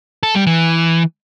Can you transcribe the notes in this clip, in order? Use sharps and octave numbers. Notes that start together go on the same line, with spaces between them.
A4
G3
E3